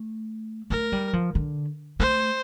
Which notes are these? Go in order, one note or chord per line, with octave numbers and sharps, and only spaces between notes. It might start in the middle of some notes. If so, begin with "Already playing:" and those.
Already playing: A3
A3 A#4
G3
F3
D3
A3 C5